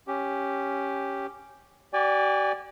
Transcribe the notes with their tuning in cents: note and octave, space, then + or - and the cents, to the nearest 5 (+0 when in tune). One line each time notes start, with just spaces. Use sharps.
C#4 +0 G4 +0
G4 -40 D5 +0 G#5 -35